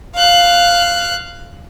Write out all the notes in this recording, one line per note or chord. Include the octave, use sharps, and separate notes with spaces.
F5 F#6